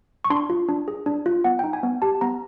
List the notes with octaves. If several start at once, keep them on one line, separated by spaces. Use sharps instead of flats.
C#6
D4 C6
F4
D4
G#4
D4
F4
B3 F#5
D#4 G5
G#5
B3
G4 A5
B3 A#5